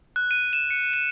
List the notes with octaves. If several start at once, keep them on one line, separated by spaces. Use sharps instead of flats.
F#6
D#7
E7
C#7
D#7